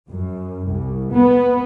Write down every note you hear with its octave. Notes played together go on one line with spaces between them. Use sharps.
F#2
C2
B3